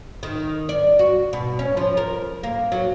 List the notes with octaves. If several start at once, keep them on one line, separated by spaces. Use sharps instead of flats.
D#3
D5
F#4
B2
C#4
F3
A#4
A#3
F#3